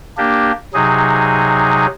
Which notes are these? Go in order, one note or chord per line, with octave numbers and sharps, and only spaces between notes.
A#3 D4 G4
C3 F#3 D#4 G#4